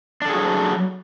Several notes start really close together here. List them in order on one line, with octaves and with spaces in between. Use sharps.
D4 A4 G#4 F#4 F#3